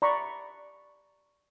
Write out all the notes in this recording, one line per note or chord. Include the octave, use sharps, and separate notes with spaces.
D5 A#5 B5 C#6